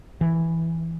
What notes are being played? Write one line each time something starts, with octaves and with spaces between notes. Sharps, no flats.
E3